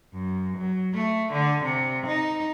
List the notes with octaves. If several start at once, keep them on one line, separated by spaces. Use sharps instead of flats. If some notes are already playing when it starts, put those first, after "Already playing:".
F#2
F#3
A3
D3
C3
D#4